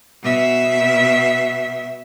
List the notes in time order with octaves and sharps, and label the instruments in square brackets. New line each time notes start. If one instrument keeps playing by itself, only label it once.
[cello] B2 E5